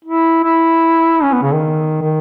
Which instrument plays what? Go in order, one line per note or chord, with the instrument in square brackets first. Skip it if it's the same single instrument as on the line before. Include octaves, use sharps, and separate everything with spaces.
[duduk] E4
E4
C#4
B3
C#3
D#3
D#3